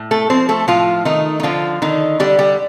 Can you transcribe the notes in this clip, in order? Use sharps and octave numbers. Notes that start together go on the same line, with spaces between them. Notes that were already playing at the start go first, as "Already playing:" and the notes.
Already playing: A2
A3 A4
F3 C4 C5
A3 A4
A2 F3 F4
D#3 A3 D#4
D#4
D3 F3 F4
D3 D#3 D#4
D3 G3 G4
G3 G4